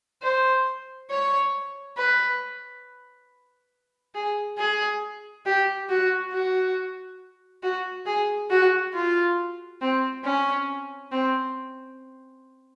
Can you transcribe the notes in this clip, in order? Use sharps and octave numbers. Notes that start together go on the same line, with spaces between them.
C5
C#5
B4
G#4
G#4
G4
F#4
F#4
F#4
G#4
F#4
F4
C4
C#4
C4